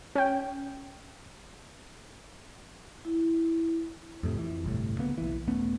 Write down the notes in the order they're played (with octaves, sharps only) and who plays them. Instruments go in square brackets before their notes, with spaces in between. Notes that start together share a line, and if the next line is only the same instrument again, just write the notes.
[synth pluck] C#4 G5
[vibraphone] E4
[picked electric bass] F2 A2 C3
F2 E3
G1 C2 A2
D2 C#3 A#3 B3
B1 E3
D#1 A3 B3 C#4